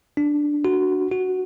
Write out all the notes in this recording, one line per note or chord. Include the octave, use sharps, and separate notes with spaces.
D4
F#4
F#4